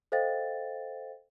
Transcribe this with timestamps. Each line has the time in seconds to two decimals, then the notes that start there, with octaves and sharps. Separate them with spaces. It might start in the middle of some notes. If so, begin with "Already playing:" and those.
0.12 A4 C5 D#5 F5 G5 A6